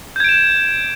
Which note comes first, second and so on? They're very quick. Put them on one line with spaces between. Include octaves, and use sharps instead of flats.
G6 G#6 D7 E7